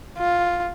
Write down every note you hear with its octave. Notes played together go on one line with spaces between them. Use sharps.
F4